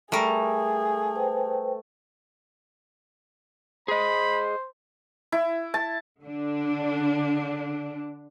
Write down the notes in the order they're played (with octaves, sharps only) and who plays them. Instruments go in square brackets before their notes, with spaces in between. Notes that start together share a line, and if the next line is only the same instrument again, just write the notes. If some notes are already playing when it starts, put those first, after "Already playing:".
[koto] G3 A#4 [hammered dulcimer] A3 [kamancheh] G#4
[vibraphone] B4 C5 G5
[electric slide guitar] G#4 D#5 [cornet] C5 [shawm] B5
[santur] E4
A5
[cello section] D3 D4